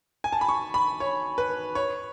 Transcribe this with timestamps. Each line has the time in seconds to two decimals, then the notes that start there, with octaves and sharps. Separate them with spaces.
0.24 G#5
0.32 A5
0.41 B5
0.49 C#6
0.74 B5
1.00 C#5
1.38 B4
1.75 C#5